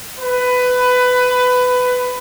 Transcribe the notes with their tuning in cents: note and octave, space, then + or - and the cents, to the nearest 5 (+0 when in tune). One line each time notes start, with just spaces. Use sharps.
B4 +15